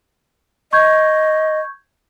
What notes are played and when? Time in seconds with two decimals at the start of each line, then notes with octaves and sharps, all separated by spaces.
0.73 D#5 C#6 G6 G#6